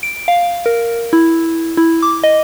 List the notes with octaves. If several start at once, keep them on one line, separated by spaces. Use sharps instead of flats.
D7
F5
A#4
E4
E4
D6
D#5